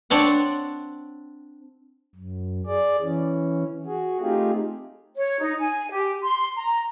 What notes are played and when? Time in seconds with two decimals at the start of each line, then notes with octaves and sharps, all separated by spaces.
0.10 C4 D4 C#5 F#5
2.15 F#2
2.66 G#4 D5
3.02 E3 C#4
3.86 F#4 G#4
4.21 A3 C4 D#4 F4 G4 G#4
5.15 C#5
5.40 D#4
5.59 G#5
5.91 G4
6.22 C6
6.56 A#5